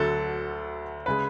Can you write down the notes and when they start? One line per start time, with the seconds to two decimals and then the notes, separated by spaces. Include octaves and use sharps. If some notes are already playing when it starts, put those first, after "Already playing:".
Already playing: D2 D3 F#3 A4
1.06 C#3 G#3 B4